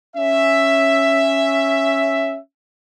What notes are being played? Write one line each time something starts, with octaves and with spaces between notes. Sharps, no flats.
C#4 E5